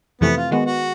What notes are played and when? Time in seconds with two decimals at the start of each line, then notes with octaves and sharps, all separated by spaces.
0.21 F2 C3 E3 A3 B3
0.37 F4
0.51 D#3 G#3 B3 F#4
0.66 F#4